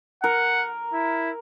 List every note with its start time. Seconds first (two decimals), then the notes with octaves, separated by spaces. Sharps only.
0.24 A#4 F#5
0.93 E4